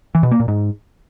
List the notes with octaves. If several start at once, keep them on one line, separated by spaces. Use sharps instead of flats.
E3
B2
A#3
A#2
G#2